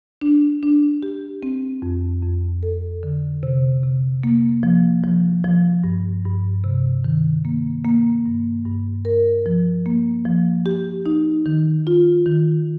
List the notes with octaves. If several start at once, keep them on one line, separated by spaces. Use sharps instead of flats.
D4
D4
G4
C4
F2
F2
A4
D3
C3
C3
A#3
F3
F3
F3
G2
G2
C3
D#3
A#3
A#3
G2
G2
A#4
F3
A#3
F3
G4
D#4
D#3
F4
D#3